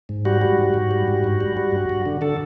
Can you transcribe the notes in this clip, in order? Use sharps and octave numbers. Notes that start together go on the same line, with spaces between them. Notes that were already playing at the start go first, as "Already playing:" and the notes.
G#2
G3 F#4
G3
G#2
G#2
G3
G#2
G2
G3
G3
G2
G2
D3
D3 A4